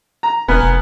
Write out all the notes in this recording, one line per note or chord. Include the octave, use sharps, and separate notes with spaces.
A#5
E1 B3 A#4 G#5
F1